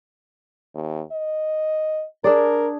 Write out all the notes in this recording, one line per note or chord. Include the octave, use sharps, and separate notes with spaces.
D#2
D#5
D4 G#4 A#4 D5